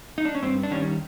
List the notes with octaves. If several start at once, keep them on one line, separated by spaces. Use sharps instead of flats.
D#4
D4
C#4
G2 C4
D4
D#3 G3 C#4